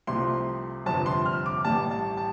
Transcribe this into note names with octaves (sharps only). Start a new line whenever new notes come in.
C2 C3 F3 A3 C6
G1 F2 C3 A5
C6
F6
D6
A1 A2 G3 A5
A5
A5